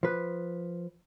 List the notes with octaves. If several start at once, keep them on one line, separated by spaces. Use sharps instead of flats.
F3 B4